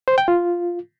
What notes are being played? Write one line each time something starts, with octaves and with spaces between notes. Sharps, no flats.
C5
G5
F4